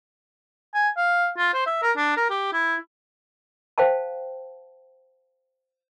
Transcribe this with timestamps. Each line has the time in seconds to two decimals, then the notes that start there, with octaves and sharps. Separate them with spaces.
0.74 G#5
0.97 F5
1.37 F4
1.54 C5
1.66 E5
1.82 A#4
1.97 D4
2.17 A#4
2.30 G4
2.53 E4
3.78 C5 F5 G5 A5